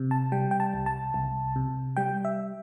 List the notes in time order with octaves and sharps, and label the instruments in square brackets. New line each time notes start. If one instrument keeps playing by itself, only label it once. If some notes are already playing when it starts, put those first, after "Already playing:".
Already playing: [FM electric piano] C3
A5
G3 G5
G5
A5
C2
A5
C2
C3
G3 G5
E5